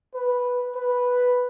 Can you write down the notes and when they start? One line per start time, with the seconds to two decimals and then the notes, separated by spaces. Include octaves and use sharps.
0.15 B4
0.76 B4